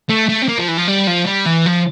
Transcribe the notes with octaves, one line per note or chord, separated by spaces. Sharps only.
A3
A3
C4
A#3
F3
E3
F3
G3
F3
G3
E3
F3